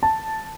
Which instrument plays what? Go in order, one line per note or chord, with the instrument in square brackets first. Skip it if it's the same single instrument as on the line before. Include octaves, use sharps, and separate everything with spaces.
[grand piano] A5